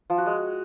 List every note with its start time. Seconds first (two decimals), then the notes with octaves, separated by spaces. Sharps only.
0.10 F3
0.18 F#4
0.26 G#3